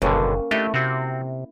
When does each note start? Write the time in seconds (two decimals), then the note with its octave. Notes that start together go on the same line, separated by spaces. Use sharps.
0.02 F#1 B1 G2 D3 A#3 C#4
0.51 A3 D4 E4 G4 D#5
0.74 C3 C4 F#4